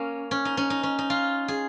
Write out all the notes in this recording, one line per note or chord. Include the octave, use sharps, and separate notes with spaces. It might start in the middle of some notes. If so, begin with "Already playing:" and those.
Already playing: A#3 C#4
C#4
D#4
C#4
D#4
C#4
D#4
F4
G#4